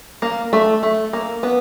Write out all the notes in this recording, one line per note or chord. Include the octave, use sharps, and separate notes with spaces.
A#3
A3
A3
A#3
B3